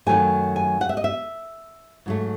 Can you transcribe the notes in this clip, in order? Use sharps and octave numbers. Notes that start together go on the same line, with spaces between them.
F#2 D#3 F#3 A3 G#5
G#5
F#5
E5
D#5
E5
G#2 F#3 A3